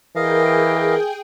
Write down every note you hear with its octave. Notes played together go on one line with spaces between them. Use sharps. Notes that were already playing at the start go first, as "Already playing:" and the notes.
E3 G#4 A#4 D#5 F5 G5